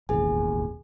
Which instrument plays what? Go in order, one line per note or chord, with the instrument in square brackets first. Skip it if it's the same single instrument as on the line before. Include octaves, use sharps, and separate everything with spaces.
[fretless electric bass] E1 A1 D#2 [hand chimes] G#4 G#5